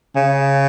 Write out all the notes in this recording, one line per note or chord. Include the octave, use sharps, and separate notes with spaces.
C#3